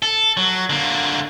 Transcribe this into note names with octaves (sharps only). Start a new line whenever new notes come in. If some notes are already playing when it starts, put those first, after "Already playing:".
A4
F#3
D3 A#3